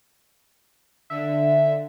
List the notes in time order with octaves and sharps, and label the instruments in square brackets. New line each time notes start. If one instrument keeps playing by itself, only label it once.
[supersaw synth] D3 [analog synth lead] E5